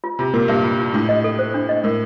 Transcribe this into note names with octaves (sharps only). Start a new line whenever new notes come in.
F4
C3 F4
A#2 A#4
G2 F5
F4
F4
A2 D4
D#5
A4
C5
D4
D#5
A2 A#4